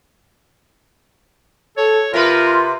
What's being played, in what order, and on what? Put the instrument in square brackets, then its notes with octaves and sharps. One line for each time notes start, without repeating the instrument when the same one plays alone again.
[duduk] A4 [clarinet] C#5
[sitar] C3 B4 [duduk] F4 [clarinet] A#4 [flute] C6